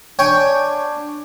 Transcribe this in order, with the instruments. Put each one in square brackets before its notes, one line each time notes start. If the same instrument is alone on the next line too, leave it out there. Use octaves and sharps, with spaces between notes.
[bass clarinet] D4 [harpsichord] C#5 G5 G#5